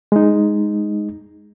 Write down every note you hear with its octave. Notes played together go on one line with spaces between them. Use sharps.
G#3 D#4